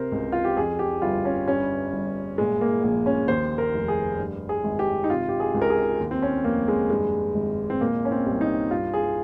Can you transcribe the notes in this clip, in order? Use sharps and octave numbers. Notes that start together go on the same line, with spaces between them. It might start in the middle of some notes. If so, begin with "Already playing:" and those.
Already playing: C3 A#4 C5
C#2
F4
G4
F2 G#4
G4
G1 F4
C#4
G2 C#4
G1
A#2 G#3
A#3
A#1 A#3
C#4
D#2 C5
A#4
F1
G#4
G2
G#4
G#1
G4
D#4
C3 F4
G4
G#4
C#2
A#4
G#4
D#2
C4
C#4
F1 A#3
G#3
G2 G#3
G#1
C4
A#2 A#3
C#4
C4
C2
D#4
G2 F4
G#4